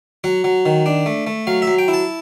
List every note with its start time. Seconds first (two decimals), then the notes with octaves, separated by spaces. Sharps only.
0.24 F#3 F#5
0.44 F#3
0.66 D#3
0.86 D4
1.06 A3
1.27 A3
1.47 F#3 F5
1.62 E5
1.67 F#3
1.79 G5
1.88 E4
1.93 A5